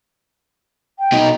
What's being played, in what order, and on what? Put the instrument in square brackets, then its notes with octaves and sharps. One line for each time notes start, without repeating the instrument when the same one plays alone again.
[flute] G5
[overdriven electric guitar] B2 D#4